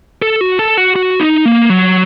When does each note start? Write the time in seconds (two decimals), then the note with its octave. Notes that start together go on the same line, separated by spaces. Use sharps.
0.22 A4
0.41 F#4
0.59 A4
0.77 F#4
0.96 F#4
1.20 D#4
1.45 A#3
1.70 F#3